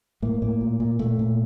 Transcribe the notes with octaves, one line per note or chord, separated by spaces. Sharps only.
A2 A#3
A2 A#3
A#2
A#2
A#2 A3
A#2